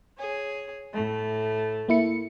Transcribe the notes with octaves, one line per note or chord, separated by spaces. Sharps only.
G#4 C#5
A2 A3
A#3 E4 C#7